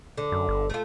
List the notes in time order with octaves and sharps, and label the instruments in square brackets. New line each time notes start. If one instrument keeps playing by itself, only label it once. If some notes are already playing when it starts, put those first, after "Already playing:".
[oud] D3
[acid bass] F#2
G1
[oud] A3 F4